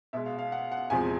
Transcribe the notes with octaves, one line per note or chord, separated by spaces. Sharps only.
B2 G#3 E5
F5
F5
F#5
F#5
E2 C3 F3 G#3 G#5